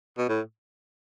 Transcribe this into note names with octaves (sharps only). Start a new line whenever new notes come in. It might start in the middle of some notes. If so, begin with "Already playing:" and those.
B2
A2